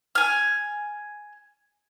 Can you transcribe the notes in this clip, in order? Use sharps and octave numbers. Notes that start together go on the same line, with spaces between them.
G#5 F6